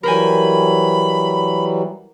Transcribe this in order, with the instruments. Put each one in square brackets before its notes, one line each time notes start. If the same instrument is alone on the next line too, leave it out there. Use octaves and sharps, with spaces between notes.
[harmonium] E3 F#3 G3 [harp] A#4 C5 G#5 [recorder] B5